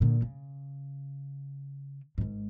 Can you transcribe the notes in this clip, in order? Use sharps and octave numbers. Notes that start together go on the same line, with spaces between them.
A#2 D3
C#3
G#1 G#2